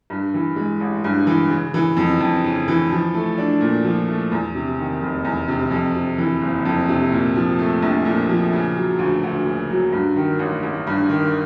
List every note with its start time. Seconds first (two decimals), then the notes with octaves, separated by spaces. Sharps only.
0.10 G2
0.34 E3
0.56 G#3
0.80 A1
1.04 G2
1.27 E3
1.50 C#3
1.74 E3
1.97 F2
2.20 F2
2.44 C#3
2.68 E3
2.91 F3
3.14 A3
3.38 D4
3.61 A#2
3.84 F3
4.08 A3
4.32 E2
4.55 C3
4.79 D#3
5.01 F1
5.25 E2
5.48 C3
5.71 F2
5.94 C3
6.18 E3
6.42 F#1
6.65 F2
6.88 C3
7.12 A#2
7.35 F3
7.59 A3
7.82 A#1
8.05 A#2
8.29 F3
8.53 C#3
8.76 F#3
8.99 D2
9.23 D2
9.46 C#3
9.70 F#3
9.92 G2
10.16 D#3
10.39 A1
10.63 A1
10.87 G2
11.09 D#3